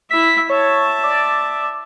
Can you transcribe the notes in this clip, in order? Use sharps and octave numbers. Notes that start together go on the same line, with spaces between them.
E4 E5 B6
C#5 E5 A5
D5